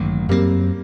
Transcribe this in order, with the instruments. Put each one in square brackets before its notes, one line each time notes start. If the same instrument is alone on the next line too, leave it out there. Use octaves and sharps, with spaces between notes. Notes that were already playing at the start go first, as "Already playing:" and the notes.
Already playing: [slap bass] A1 G2 D#3 F#3 [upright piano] A#3
[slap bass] F#2 F#3 A3 C4 [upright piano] G3 A#3